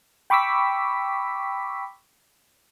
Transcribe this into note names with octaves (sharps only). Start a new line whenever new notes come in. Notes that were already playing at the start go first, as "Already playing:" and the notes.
G5 B5 C#6 D6 E6 B6